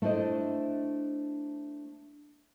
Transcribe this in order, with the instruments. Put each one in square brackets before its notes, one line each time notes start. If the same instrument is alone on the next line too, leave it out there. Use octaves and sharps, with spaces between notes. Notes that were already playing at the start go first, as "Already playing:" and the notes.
[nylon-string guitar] A3 D4 E4 C5 D#5